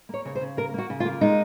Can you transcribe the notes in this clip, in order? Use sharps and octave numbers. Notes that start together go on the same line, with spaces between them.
A#3 C#5
C#3 C#5
C5
C#3
A#3 A#4
A#3 F#4
C#3
F4
A#3
G#3 D#4